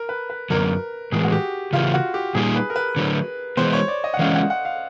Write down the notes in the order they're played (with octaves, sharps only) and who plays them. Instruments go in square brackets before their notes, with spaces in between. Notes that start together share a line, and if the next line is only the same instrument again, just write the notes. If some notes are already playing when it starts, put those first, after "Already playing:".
Already playing: [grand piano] A#4
B4
B4
[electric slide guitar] F#2 D3 F#3 [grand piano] A#4
[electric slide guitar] A2 E3 G#3 [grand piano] G#4
[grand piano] F#4
G4
[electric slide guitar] C#3 E3 A3 [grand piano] F4
[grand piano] F#4
G4
[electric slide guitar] A#2 G3 A#3 D#4 G4 [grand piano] G#4
[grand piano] B4
A#4
B4
[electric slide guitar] D3 F#3 A3
[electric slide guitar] E3 G#3 B3 [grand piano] C5
[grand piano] C#5
D5
D#5
F#5
[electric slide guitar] E3 G#3 C#4 [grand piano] F5
[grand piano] F#5
F#5
F5